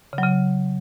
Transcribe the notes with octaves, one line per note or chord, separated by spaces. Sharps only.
C#3
F#3
C#3